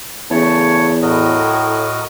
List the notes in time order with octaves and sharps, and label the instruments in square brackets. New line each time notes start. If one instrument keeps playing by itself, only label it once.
[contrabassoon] E2 [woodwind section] C#3 C#5 [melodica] A3 A5
[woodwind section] A2 [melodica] F#4 A#4 D#5